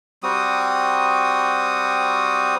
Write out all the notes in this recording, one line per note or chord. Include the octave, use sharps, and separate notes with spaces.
G3 C4 F#4 D#6